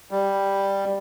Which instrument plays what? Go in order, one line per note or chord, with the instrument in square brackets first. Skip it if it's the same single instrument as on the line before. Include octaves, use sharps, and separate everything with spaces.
[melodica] G3